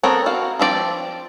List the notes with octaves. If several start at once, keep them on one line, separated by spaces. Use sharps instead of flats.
B3 C4 A4 A#4 C#5
F#4 F5
F3 C4 F4 D5 G5